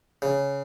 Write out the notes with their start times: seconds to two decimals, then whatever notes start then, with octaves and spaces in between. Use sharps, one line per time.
0.22 C#3